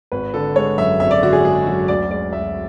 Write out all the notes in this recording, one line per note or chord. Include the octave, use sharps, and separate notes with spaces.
G#1 B4
D3 A4
G#3 C#5
F#2 E5
G#1 E5
D5
D3 F#4
G#4
G#3 G#4
F#2 F#4
D2 D5
G#3 D5
D2 E5